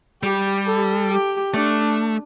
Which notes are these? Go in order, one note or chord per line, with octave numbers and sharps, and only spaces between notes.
G3 G4
A4
G4
A3 D4